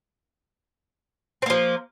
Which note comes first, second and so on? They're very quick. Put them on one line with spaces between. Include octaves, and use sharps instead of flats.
C4 A#3 F3